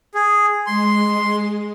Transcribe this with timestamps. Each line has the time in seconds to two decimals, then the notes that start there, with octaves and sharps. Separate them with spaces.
0.15 G#4
0.66 G#3 C6